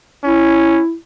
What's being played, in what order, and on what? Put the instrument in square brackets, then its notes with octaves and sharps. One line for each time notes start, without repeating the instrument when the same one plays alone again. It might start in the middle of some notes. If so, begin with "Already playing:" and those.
[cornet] C#4 [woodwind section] E4